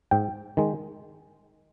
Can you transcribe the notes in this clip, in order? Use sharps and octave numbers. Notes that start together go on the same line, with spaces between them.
G#2 G5
D#3 G#3